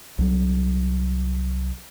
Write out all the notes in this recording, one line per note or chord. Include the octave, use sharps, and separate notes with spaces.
C2 F#3